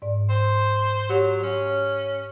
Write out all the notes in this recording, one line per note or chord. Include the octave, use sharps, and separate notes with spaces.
G#2 D5
C5
F#3 G4 C#5
C#4